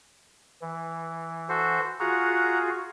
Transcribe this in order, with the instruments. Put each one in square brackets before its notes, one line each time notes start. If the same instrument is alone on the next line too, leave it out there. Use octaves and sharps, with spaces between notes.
[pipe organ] E3
[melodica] F#4 A4 C5
[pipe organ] F4 F#4 G#4 [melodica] F#5 A#5